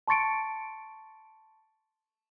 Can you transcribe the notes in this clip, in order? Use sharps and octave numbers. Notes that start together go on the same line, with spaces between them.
A5 C6 C#6 A6 C#7 D7